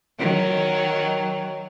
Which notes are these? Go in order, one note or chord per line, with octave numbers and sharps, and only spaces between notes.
D#3 F#3